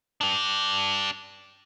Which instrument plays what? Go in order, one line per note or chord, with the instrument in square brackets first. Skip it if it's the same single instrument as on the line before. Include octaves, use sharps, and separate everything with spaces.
[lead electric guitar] D4 G4